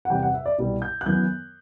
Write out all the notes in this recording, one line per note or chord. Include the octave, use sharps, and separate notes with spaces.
F#5
E2 C3 G3 G5
F#5
E5
D5
C2 B2 G3
G6
F#6
F#2 E3 B3 G6